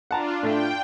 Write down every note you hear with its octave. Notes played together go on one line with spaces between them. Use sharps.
D4 F4 F#5 A5 A#5
A2 A3 G5